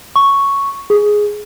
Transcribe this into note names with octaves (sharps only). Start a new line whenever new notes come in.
C#6
G#4